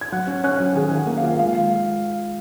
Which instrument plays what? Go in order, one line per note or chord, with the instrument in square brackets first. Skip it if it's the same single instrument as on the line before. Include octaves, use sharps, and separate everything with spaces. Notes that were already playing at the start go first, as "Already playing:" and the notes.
[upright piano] G#6
[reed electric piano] F#3 [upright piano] F#5 F#6
[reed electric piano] C#4
[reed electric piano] C#4 [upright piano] F#5 F#6
[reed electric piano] F#3
[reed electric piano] D#3 [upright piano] G#4 G#5
[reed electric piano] D#3
[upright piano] F#5
[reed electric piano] A#3
[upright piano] F5
[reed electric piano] F4
[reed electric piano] G#3 [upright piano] F5